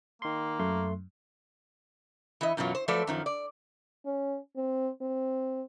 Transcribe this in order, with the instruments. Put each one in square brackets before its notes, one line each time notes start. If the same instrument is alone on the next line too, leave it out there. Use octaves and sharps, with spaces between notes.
[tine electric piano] D#3 C6 [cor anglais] A#3
[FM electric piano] F#2 [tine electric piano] A3 C6
[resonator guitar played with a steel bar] E3 E4 D#5
F#2 B2 E3 F#3 F4
C5
F3 F#3 A3 A4 B4 D5
F#2 D#3 F3
D5
[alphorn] C#4
C4
C4